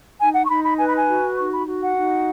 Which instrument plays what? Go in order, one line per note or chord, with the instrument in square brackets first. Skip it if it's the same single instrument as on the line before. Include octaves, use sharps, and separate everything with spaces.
[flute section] D#4 G#5
F#5
C#6
D#4 B5
B5
B4 G#5
B5
G#5
F#4
D#4 C#6
B5
F#4
F#5
D#4